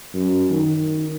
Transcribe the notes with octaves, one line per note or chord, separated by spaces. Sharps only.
F#2
D#3